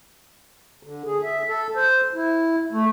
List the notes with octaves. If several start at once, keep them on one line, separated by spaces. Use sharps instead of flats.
D3
G#4
E5
A4
C5
E4
A3